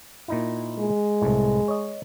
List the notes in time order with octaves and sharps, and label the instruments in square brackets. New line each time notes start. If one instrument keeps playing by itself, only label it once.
[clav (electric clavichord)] A#2 D#4 E4
[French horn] G#3
[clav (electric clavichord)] C2 A2
C#5 D#5